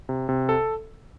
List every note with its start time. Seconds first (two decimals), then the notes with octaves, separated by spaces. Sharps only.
0.09 C3
0.29 C3
0.49 A4